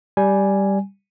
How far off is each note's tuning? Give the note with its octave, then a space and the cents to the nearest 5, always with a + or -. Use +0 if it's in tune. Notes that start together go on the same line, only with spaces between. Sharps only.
G3 +0 G#5 +0